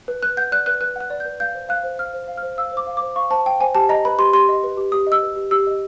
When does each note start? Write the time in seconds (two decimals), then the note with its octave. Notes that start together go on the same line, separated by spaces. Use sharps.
0.08 B4
0.23 B4 F#6
0.37 F#5 G6
0.52 D5 F#6
0.66 B4 F#6
0.81 B4 F#6
0.96 F#5 F#6
1.10 D5
1.20 B4 G6
1.40 F5 G6
1.54 C5
1.69 F5 F#6
1.83 C5
1.98 F5 F6
2.13 C5
2.28 F5
2.37 F6
2.43 C5
2.57 F5 E6
2.72 C5
2.77 D6
2.87 F5
2.97 C5 D6
3.16 F5 C#6
3.30 C5 A5
3.45 F5 G5
3.61 C5 G#5
3.75 G4 A5
3.89 D#5 A#5
4.05 B4 B5
4.19 G4 C6
4.33 G4 C6
4.49 D#5
4.64 B4
4.77 G4
4.92 G4 D#6
5.07 D#5
5.12 E6
5.22 B4
5.36 G4
5.51 G4 E6
5.67 D#5